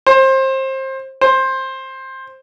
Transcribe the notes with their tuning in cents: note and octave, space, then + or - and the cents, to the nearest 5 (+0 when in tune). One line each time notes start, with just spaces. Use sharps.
C5 +25
C5 +15